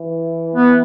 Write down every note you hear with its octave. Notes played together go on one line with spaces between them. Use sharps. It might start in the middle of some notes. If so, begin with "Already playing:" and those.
Already playing: E3
B3